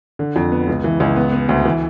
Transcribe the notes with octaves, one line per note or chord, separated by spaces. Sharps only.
D3
F2
B3
C#2
E3
C#2
B3
B3
D2
E3